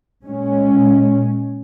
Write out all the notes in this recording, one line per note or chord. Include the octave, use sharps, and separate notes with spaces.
A#2 G#3 C#4